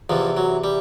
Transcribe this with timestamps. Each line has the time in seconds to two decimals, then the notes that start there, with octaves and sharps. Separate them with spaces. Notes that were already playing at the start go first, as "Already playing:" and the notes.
0.10 E2 C3 E3 F3
0.37 F#3
0.64 G3